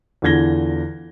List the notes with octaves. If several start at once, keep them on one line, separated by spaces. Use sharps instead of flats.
E2 D3 F4 G#6 A#6 G7